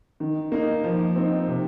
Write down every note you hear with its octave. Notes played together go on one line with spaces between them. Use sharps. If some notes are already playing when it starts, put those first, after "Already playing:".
D#3
A#3 D#4
F3
C4 D#4
C3